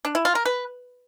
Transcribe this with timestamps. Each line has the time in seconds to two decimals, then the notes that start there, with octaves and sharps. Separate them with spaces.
0.05 D4
0.15 E4
0.25 F4
0.35 A#4
0.45 B4